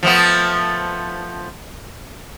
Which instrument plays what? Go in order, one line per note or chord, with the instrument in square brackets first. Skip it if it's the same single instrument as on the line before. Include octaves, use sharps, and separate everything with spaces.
[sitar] F3 A3 B3